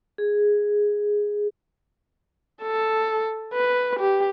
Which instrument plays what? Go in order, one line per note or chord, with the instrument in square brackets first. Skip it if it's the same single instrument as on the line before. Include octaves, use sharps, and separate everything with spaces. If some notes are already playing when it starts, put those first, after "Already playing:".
[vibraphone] G#4
[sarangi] A4
B4
G4